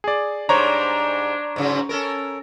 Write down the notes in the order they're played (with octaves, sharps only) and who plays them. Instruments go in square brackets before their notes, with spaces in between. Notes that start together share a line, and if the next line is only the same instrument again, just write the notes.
[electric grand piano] G#4 D5
[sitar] G#2 G3 [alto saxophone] D4 [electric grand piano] C5 C#5 A#5
[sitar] G#2 C#3 F#3
C#4 A4 A#4